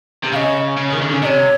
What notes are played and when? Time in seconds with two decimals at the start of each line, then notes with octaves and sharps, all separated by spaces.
0.24 C3
0.32 C#3 F5
0.36 D#5
0.77 C#3
0.91 D#3
1.02 D3
1.11 C#3
1.22 C3 C#5 D#5